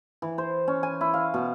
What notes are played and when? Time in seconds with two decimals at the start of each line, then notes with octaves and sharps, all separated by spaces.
0.22 E3
0.38 C5
0.68 C#4
0.83 G#5
1.01 E4
1.14 F5
1.34 B2